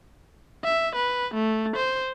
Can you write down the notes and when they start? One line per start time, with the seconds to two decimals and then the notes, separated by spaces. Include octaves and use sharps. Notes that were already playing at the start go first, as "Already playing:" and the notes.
0.64 E5
0.95 B4
1.34 A3
1.76 C5